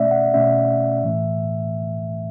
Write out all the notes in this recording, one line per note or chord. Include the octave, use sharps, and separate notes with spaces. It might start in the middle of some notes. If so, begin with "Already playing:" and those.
Already playing: B2 A3 C#4 D5 E5
F#5
B2 A3 C#4 E5
A2 E3 A3